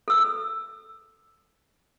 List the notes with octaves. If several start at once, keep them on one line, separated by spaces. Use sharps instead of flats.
A4 E6